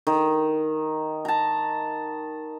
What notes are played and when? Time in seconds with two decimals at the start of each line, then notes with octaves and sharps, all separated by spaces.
0.07 D#3
1.25 A5 A#5